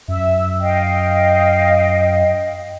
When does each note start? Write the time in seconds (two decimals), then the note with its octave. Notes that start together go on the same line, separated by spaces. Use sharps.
0.08 F#2 E5
0.60 D#5 F5 G5